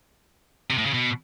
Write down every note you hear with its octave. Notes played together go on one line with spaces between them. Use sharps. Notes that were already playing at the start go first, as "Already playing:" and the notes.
C3
A2
C#3
B2